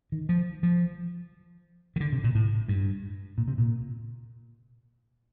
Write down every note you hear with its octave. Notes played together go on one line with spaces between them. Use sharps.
D#3
F3
F3
D#3
D3
C3
A#2
A2
G2
A#2
C3
A#2